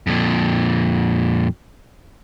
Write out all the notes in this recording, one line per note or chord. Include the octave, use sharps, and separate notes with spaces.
F2 A#2